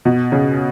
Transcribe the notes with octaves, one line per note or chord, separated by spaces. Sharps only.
B2
C#3